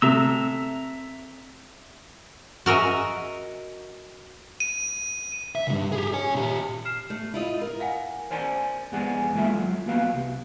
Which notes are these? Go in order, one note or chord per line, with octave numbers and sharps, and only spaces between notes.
C3 A3 E5 A#5 E6
F#4 A#4 D#5 E5
D#7
E5
C2 G2
G4 G#4
C#5 G#5
A#2 G4
F6 C7 E7
A3
E4 F4 D#5
A#4
F5 F#5 G#5
A#4 C5 D5 G#5
F2 G#3 B3 G#4 D5 G#5
G#3 A#3 E4 F4 A4 E5
F#3 F4
A#3 B3 F#4 B4 F5
C2